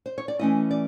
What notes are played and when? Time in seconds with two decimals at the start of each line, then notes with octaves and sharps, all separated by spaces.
0.06 C5
0.18 C#5
0.28 D5
0.39 E3 A3 C#4 E4 D#5
0.71 D5